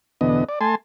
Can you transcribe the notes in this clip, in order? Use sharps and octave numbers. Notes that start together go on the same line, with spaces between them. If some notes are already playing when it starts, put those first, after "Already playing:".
E2 B2 D3 B3 D#5
D5
A3 G#5 A5 C6